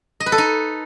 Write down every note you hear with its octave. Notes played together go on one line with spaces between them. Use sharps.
D#5
B4
A4
D#4